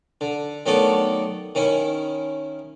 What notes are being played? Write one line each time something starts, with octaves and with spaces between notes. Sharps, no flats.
D3
D#3 F#3 A3 B3 A4 D5
D#3 C#4 E4